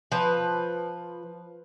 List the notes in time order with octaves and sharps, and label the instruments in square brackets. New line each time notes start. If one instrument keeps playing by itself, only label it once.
[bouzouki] F3 B4